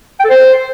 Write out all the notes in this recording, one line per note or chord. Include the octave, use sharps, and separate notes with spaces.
G5
A4
C5